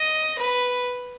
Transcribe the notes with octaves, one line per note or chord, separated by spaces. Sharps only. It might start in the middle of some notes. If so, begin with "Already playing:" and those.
Already playing: D#5
B4